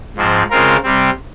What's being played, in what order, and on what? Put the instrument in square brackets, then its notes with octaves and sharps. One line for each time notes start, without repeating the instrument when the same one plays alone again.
[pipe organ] G#2 F3 C4
C#3 G#3 C4 F4 A#4
C3 G3 C4